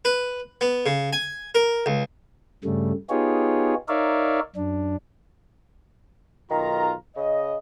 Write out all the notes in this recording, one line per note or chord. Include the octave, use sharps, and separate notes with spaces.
B4
B3
C#3
G#5
A#4
C#2
G2 C#3 G3 A3
B3 D#4 F4 G4 G#4 C#5
D#4 A#4 C#5 D5 E5 F5
F#2 D4
B1 D#3 F4 A#5
C#3 D#5